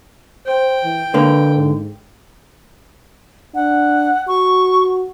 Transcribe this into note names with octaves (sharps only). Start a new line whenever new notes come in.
C5 G5
E3
D3 A#3 B4
G#2
D4 F#5
F#4 C#6